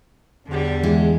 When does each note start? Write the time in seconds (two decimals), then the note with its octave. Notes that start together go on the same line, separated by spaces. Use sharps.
0.47 E2 D3 G3
0.84 E3 G#3